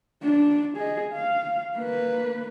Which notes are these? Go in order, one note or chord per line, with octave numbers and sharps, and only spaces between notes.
D4
G#4 D#5
F5
A#3 B4